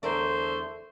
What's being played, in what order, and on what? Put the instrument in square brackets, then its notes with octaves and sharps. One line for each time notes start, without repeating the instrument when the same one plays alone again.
[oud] E2 A#4 D5 [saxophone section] D3 A3 C5